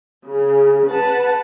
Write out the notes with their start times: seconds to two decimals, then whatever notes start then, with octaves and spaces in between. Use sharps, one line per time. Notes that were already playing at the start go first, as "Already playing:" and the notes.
0.25 C#3
0.88 B4 F#5 A5